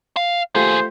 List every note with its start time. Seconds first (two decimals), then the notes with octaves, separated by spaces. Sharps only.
0.17 F5
0.55 D#2 A3 F4 G4 G#4 C5